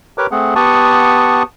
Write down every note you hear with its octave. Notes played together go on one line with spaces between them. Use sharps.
G4 A#4 B4 C#5 D6
A3 C4 G#4 F#5
B3 G4 F#5 A5 C#6 D#6